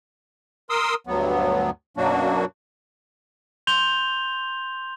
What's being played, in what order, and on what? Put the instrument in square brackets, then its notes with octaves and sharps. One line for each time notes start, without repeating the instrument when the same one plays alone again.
[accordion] A#4 C6 D#6 E6
D2 G2 F#3 B3
F#2 B2 F#3 A#3 D4 F#4
[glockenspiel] C6 G6 F7 G7